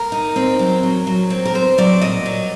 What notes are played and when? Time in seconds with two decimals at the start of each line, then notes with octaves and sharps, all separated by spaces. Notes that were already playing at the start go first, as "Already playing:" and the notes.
Already playing: A#4
0.12 D#4
0.36 C4
0.59 F#3
0.83 F#3
1.07 F#3
1.30 C4
1.45 A#4
1.55 C4 C5
1.78 F#3 D5
2.01 A#2 D#5
2.26 F#3